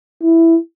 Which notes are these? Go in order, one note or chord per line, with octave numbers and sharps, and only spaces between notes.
E4